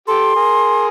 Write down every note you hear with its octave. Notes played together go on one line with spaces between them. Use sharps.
G4 A4 C6
G#4 A#4